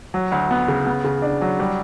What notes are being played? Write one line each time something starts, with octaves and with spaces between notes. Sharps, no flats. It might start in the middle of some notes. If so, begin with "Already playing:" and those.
F#3
D2
B3
C#3
B3
C#3
D4
F#3
G3